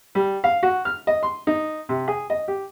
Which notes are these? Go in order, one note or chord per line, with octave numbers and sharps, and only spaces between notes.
G3
F5
F#4
F6
D#5
C6
D#4
C3
G#4
D#5
G4